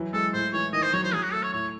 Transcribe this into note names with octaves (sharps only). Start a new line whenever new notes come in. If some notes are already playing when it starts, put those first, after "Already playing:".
Already playing: E3 F#3
G#3 A4
A2 C5
E3 C#5
D#3 D#5
C5
F#3 C#5
C5
F#3 G#4
F#4
A3 A4
C#5
A2 C#5